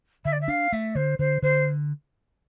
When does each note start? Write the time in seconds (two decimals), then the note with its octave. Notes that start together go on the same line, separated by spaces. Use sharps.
0.25 D3 E5
0.32 D5
0.41 E5
0.48 D4 F5
0.72 A3 E5
0.95 D3 C5
1.19 D3 C5
1.42 D3 C5